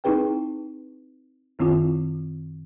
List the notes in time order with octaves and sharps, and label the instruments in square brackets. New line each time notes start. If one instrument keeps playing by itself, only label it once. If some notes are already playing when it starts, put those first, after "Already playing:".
[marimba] C4 D#4 E4 G#4 B4 G5
F#2 D#3 C4 E4 F4